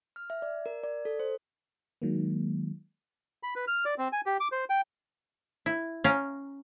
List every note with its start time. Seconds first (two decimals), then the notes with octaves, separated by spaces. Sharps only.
0.16 F6
0.30 E5
0.42 D5
0.66 A#4
0.83 D5
1.05 A4
1.20 C5
2.02 D#3 F#3 G#3 A#3
3.43 B5
3.56 B4
3.68 F6
3.85 D5
3.98 C4
4.13 G#5
4.26 G4
4.40 D6
4.52 C5
4.70 G5
5.66 E4
6.04 C#4 F5 G5 A#5